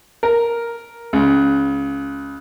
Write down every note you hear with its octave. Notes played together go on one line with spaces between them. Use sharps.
A#4
C#2